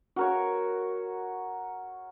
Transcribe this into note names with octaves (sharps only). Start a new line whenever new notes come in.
F#4 A#4 C#5